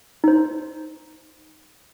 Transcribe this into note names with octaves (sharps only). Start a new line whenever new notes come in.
D#4 C5